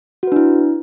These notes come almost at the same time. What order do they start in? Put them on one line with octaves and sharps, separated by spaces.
F#4 B4 D4 E4